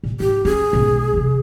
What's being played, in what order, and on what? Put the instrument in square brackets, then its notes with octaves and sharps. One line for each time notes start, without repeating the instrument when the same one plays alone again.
[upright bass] A#2
[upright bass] G#2 [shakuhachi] G4
[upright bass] C#4 [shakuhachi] G#4
[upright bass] B1 G#2
F2 C3